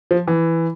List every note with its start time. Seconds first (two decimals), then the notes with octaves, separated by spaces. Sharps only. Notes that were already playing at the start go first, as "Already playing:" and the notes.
0.11 F3
0.28 E3